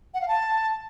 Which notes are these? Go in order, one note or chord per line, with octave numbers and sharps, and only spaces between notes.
F#5
F5
A5